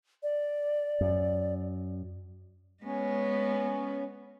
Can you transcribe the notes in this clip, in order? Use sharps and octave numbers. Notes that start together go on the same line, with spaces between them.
D5
F#2
G#3 B3 C#4